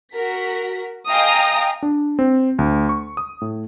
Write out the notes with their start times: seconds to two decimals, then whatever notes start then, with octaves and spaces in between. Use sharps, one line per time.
0.13 F#4 A#4 B6
1.08 D#5 F5 G5 G#5 A#5 D#6
1.83 D4
2.19 C4
2.59 D2
2.89 C#6
3.17 D#6
3.41 A2